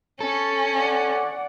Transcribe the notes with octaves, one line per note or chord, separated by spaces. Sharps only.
C#4 A4
D5 F#5